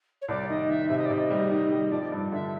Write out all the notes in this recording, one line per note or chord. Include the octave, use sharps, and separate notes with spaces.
C#5
C2 D5
D#3 D#5
D#3 E5
C3 E5
D#5
D5
C3 D#5
G3
D#3
G3
F3 D5
G2
D3 E5